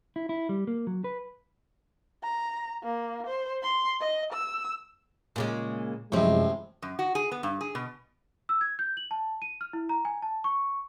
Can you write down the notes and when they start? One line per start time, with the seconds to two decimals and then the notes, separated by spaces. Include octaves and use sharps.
0.16 E4
0.29 E4
0.49 G3
0.67 A#3
0.87 F#3
1.04 B4
2.23 A#5
2.83 A#3
3.27 C5
3.63 C6
4.01 D#5
4.33 E6
5.36 A#2 C#3 G#3
6.12 A1 F#2 A2 C3 F3 G#3 C4 C#4
6.82 F#2
6.99 F#4
7.15 G#4
7.32 B3
7.43 G2
7.61 G#4
7.75 B2
8.49 E6
8.61 G#6
8.79 G6
8.97 F#7
9.11 A5
9.42 D#7
9.61 F6
9.73 E4
9.89 A#5
10.05 G#5
10.22 A5
10.44 C#6